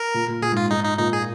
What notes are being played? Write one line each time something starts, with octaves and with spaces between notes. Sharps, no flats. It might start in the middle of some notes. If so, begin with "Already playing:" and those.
Already playing: A#4
A#2
A#2
A#2 G#4
G#2 F4
G#2 D#4
D#4
A#2 D#4
G#4